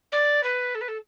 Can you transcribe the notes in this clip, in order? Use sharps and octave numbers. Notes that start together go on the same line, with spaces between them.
D5
B4
A4
B4
A4